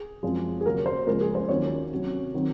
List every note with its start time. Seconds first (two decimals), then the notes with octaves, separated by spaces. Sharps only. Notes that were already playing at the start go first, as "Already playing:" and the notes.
Already playing: G#4
0.23 F#2 F3 G#3 C4 F4
0.61 G#4
0.65 D#2 C#3 F#3 A#3 A#4
0.86 C5
1.07 C#2 C#3 F3 A#3 A#4
1.21 G#4
1.35 C5
1.49 D#2 D#3 F#3 C#4 F4 C#5
1.91 C3 F#3 C#4
2.34 D#3 F#3 C4